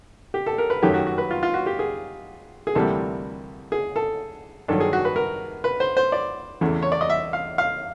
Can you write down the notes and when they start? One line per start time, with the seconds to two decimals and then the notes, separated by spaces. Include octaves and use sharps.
0.34 G4
0.46 A4
0.58 A#4
0.70 B4
0.82 F#2 D#3 F#3 A3 G4
0.94 F#4
1.07 F#4
1.18 B4
1.31 F4
1.43 F4
1.54 F#4
1.66 G4
1.79 G#4
2.67 G#4
2.75 D2 C3 E3 G3 A#3 A4
3.72 G#4
3.96 A4
4.68 G2 D#3 F#3 A4
4.80 G#4
4.93 F#4
5.05 B4
5.16 A#4
5.64 B4
5.80 C5
5.97 C5
6.12 D5
6.61 E2 C#3 E3 A3
6.82 C#5
6.92 D5
7.01 D#5
7.10 E5
7.33 F5
7.58 F5